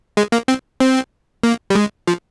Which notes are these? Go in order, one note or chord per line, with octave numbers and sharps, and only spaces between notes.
G#3
A#3
C4
C4
A#3
G3
G#3
F3